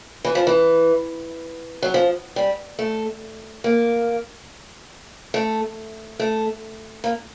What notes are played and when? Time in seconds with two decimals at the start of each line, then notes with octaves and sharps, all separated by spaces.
0.24 E3
0.35 F3
0.47 E3
1.82 F#3
1.94 F3
2.36 G3
2.79 A3
3.64 A#3
5.34 A3
6.20 A3
7.04 A#3